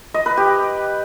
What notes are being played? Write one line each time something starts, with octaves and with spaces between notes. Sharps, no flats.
D#5
B4
G4